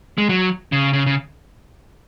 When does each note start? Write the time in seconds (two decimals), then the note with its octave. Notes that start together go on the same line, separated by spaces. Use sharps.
0.18 G#3
0.29 F#3
0.72 C#3
0.93 C#3
1.06 C#3